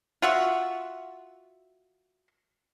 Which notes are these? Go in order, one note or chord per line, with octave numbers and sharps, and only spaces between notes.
F4 F#4 E5